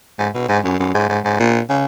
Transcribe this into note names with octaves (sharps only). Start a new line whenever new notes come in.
G#2
B2
G#2
F#2
F#2
G#2
G#2
G#2
A#2
C#3